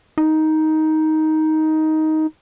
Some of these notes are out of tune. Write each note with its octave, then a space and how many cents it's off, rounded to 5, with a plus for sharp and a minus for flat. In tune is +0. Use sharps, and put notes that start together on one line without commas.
D#4 +10